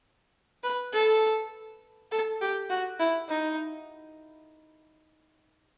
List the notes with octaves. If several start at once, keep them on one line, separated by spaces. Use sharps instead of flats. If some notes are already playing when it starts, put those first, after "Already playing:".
B4
A4
A4
G4
F#4
E4
D#4